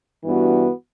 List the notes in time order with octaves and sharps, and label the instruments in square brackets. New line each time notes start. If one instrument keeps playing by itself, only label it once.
[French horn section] G2 E3 B3 F#4